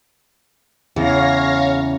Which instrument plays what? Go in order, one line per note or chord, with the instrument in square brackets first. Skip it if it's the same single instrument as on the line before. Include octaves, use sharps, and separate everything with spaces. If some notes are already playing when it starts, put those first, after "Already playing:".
[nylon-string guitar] E2 C#3 [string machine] C#5 F5 A#6